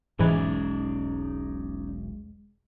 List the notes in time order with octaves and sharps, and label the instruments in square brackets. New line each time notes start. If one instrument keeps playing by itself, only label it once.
[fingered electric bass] E1 B1 [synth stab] G#2 E3 [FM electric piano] G#3 [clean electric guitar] C#4 D#4 D5